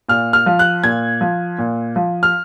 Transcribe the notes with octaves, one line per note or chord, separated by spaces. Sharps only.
A#2 F6
F6
F3
F#6
A#2 G#6
F3
A#2
F3
F6